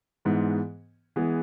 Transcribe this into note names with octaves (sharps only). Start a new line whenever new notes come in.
G#2 E3 G#3 B3
E3 G#3 B3 G#4